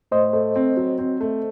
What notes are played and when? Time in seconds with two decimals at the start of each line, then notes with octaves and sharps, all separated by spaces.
0.11 A2 C5 D#5
0.33 A3
0.56 C4
0.77 F#3
0.98 C4
1.21 A3